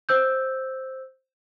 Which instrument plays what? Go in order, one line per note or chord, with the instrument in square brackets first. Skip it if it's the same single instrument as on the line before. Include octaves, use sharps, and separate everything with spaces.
[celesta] C5 E6 G6